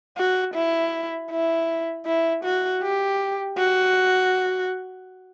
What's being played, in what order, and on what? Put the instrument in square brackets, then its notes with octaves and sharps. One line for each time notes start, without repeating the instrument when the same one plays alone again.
[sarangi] F#4
E4
E4
E4
F#4
G4
F#4